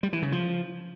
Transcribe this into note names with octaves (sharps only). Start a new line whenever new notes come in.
G3
E3
C#3
F3